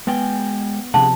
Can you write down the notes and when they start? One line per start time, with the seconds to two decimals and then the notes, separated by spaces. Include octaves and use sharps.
0.07 G#3 B3 G5 G#5
0.94 C3 F3 D4 G#4 F#5 A5